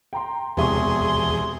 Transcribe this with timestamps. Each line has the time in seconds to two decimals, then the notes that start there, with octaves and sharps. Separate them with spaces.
0.13 G5 A#5 C6
0.57 E1 E2 C3 G4 G#4 E5 C6 C#6